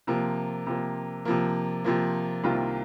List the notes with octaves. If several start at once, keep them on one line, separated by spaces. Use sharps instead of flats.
C3 F3 A#3
C3 F3 A#3
C3 F3 A#3
C3 F3 A#3
C2 C3 D#3 A#3 F4